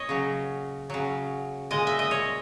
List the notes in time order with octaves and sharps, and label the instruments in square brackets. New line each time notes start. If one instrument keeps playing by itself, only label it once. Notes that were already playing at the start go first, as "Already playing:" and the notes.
Already playing: [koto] A#2 C#5 D#5
C#3 F#3
C#3 F#3
A#2 G#3 D#5
E5
D#5
C#5